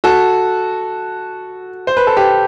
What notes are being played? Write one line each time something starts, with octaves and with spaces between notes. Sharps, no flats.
F#4 A4
C5
B4
A4
G4 B4